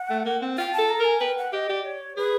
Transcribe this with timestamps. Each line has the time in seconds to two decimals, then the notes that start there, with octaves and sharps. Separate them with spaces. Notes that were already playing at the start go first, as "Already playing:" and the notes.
Already playing: F#5
0.10 A3
0.25 A#3
0.42 C4
0.58 F4 G5
0.73 A5
0.78 A4
0.89 A#5
1.00 A#4 G#5
1.21 B4 G5
1.38 F#5
1.53 G4 D#5
1.69 G4 D5
1.85 C#5
2.17 G#4 B4